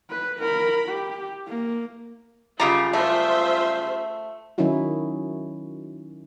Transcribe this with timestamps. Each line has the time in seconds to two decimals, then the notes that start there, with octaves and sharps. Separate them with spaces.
0.10 B4
0.40 A#4 B5
0.89 G4
1.48 A#3
2.60 F#2 C#3 G3 F4 A#5
2.93 A3 F4 A#4 C5 E5
4.58 D#3 F#3 C#4 D#4 E4 F#4